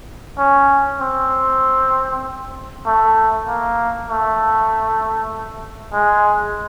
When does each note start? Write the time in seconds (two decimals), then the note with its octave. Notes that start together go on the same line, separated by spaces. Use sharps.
0.38 C#4
1.01 C4
2.86 A3
3.47 A#3
4.09 A3
5.93 G#3